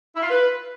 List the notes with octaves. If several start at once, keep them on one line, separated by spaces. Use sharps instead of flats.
E4
F4
B4